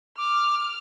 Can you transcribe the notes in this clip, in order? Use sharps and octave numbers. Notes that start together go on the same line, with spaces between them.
D6 F6